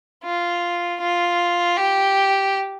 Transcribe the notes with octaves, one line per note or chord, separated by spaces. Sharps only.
F4
F4
G4